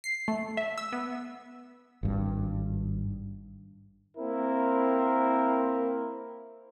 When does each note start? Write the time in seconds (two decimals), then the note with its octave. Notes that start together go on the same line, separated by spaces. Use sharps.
0.04 C7
0.28 A3
0.57 E5
0.78 E6
0.93 B3
2.03 G#1 G2
4.17 A#3 C4 E4 A#4